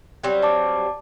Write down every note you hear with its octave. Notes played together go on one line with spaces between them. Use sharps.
F#3 G3 C4
D5 A5 D6